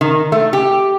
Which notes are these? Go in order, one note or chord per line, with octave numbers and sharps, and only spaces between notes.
D#3
A3
G4